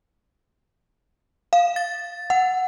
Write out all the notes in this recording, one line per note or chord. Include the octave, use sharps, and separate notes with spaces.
F5
A6
F#5